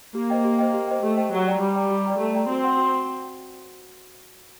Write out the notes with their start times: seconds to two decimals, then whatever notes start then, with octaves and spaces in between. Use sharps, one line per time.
0.15 A#3 G4
0.30 C5 D#5 G5
0.45 G4
0.58 C5 D#5 G5
0.74 G4
0.88 C5 D#5 G5
1.03 A3 G4
1.17 C5 D#5 G5
1.32 F#3 G4
1.47 D5 G5 A#5
1.61 G3 G4
1.76 D5 G5 A#5
1.91 G4
2.05 D5 G5 A#5
2.19 A3 G4
2.34 D5 G5 A#5
2.48 C4 F#4
2.63 C5 F#5 C6
2.77 F#4